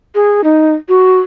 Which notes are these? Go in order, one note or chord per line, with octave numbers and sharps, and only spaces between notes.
G#4
D#4
F#4